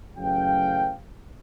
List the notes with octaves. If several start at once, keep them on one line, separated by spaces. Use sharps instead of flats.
A1 F#2 C#3 F5 G5